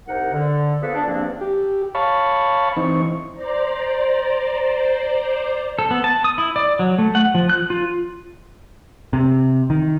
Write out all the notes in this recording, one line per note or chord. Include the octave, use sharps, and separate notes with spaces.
C2 C3 D#4 A#4 F#5
D3
F3 A#3 B3 G#4 A4 B4
D4
E2 G2 F3 A#3 C4 D4
G4
C#5 F5 A5 B5 C#6
E3 C4 D#4 C#6
C5 D5 A#5
A4
B3
A5
D#6
E4
D5
F#3
A3
F#5
F3
F#6
F4
C3
D#3